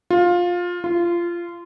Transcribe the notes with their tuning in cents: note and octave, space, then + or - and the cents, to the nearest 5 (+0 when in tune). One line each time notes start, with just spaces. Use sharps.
F4 +15
F4 -20